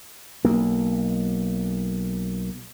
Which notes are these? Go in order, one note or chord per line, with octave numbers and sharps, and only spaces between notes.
B1 A#3